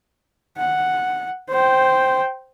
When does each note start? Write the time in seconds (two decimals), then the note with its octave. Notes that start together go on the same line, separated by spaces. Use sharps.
0.58 F#5
1.50 C5 G5